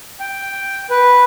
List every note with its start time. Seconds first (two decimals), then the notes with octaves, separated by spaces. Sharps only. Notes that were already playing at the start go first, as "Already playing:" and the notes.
0.20 G5
0.90 B4